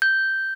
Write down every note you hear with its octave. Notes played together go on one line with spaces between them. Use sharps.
G6